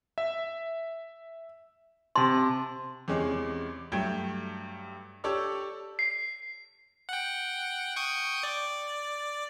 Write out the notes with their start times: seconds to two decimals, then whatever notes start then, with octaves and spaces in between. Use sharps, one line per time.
0.18 E5
2.16 C3 A5 C6
3.08 E2 C3 G#3 C#4
3.92 G2 F#3 A3 G5 G#6
5.24 G4 A4 C#5 D5 E6
5.99 C7
7.09 F#5 G5
7.96 G5 C#6 D#6
8.43 D5